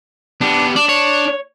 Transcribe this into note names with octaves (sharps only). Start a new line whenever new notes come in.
B3 D4 G4
D4 D5
C#5